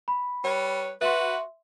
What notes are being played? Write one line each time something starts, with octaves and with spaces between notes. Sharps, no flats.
B5
G3 B4 C#5
F#4 B4 E5 C6